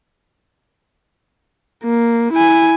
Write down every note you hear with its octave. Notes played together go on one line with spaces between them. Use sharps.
A#3
E4 G#5